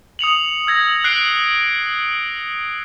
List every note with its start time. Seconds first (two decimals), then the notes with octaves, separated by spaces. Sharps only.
0.19 D#6 C#7 F7 F#7
0.67 E6 G#6 A#6
1.04 F#6 C7 D7 G7